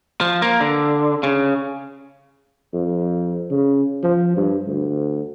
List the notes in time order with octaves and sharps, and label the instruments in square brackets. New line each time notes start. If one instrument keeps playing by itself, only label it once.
[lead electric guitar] F3
A#3
D3
C#3
[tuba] F2
C#3
F3
G2
D2